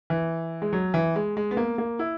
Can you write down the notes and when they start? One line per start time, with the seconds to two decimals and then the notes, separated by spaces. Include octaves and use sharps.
0.10 E3
0.62 G#3
0.73 F#3
0.94 E3
1.16 G#3
1.37 G#3
1.51 B3
1.57 A#3
1.78 A#3
1.99 E4